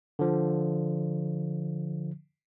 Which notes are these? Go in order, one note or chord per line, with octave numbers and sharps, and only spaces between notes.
D3 F3